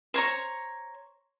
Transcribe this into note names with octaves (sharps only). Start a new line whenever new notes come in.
C5 C#5 A#5 C#6